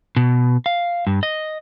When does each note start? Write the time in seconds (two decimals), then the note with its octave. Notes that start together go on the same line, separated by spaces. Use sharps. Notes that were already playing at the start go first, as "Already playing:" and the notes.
0.16 B2
0.66 F5
1.07 G2
1.23 D#5